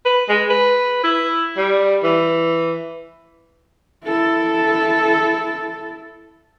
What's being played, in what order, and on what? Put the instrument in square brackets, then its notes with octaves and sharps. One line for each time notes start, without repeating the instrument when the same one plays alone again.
[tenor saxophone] B4
G#3
B4
E4
G3
E3
[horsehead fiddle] E4 A4